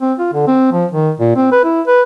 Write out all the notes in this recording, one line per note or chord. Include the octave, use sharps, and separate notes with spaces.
C4
F4
D3
C4
F3
D#3
A#2
C4
B4
E4
B4